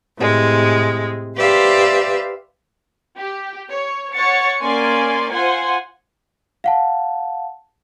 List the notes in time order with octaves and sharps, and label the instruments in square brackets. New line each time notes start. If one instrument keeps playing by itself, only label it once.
[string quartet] A2 C3 G#3
G4 B4 C5 D5 E5 F5
[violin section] G4
C#5
C#5 F#5 C#6 A6 C#7
A#3 C#4 D5 G#5 C6
F4 C5 F#5 G#5 C6
[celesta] F5 F#5 A5